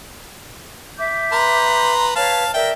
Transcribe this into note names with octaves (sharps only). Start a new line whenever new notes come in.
E5 D6 G6
B4 A#5 C6
B4 C#5 F5 A5
A#4 D5 E5 G5